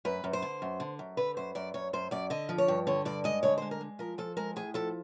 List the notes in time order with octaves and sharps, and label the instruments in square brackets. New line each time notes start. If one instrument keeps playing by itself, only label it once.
[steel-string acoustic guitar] F#2 B4
F#2
C5
D3
F#2
D3
F#2
D3 B4
F#2 C5
F#2 D5
F#2 C#5
F#2 C5
F#2 D5
D3 D#5
F3
C#5
G2
D3 C#5
G2 D5
G#3 D#5
D3 C#5
G#3 C5
A#4
G#3
F3 A#4
F3 A4
G#3 A#4
A2 G#4
F3 A4